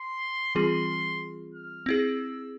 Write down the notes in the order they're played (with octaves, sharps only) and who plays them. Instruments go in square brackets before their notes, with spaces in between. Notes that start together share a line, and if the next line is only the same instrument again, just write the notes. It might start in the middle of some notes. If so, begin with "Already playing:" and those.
Already playing: [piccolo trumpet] C6
[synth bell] E3 G3 C4 F4 G#4 [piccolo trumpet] C6
[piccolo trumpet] F6
[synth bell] C4 E4 G#4 [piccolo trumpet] E6